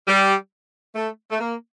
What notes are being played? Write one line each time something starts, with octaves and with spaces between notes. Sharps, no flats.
G3
A3
A3
A#3